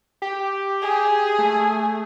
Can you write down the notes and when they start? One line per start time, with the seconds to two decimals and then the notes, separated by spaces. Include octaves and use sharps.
0.22 G4
0.82 G#4
1.39 A3